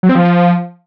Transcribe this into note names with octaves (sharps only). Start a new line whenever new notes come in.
F#3
C4
F3